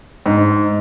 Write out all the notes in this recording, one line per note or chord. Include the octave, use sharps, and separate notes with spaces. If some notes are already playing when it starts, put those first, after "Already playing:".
G#2